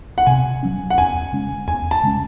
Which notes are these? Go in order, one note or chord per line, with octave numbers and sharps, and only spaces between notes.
F#5
C3 G#5
F#3 C#4
F#5
E2 G#5
C#3 G#3 C#4
E2 G#5
A5
C#3 G#3 C#4